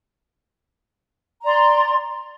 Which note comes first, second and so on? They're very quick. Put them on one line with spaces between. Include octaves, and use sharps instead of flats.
A#5 D5 C6